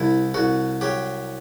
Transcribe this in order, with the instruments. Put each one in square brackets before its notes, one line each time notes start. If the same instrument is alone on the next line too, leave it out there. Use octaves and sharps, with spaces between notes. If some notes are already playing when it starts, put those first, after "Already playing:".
Already playing: [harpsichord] C2 C3 E4
C2 F#4
F#3 G4